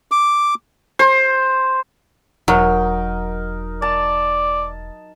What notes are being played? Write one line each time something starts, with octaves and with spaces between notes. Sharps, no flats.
D6
C5
E1 F#3 D#4 A#4
D5 A5